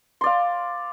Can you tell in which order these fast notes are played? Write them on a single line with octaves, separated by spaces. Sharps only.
C6 D5 F5